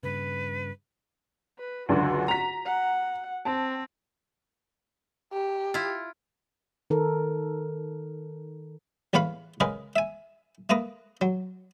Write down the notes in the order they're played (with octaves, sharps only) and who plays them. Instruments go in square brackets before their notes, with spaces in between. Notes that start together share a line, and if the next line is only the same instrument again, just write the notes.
[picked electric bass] G2 C#3 [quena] B4
[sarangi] B4
[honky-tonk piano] C#2 F#2 D3 [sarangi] F#4
[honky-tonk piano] A#5 B6
[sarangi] F#5
[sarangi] C4 [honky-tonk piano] A5
[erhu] G4
[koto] E4 F4
[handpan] D#3 A4 A#4
[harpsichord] A1 E2 B4 C#5 F5 B5
C#3 G#3 G#4 A#4 B4
E5 G#5
A3 A#3 B4 A#5 D#6
F#3